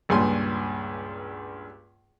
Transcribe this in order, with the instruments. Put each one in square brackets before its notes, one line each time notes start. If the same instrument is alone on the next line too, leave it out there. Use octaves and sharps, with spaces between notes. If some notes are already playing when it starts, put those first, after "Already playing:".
[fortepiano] C#2 G2 A#2 G#5 C6